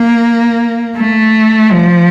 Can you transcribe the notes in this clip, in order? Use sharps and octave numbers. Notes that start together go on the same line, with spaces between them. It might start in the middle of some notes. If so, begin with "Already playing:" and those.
Already playing: A#3
A3
F3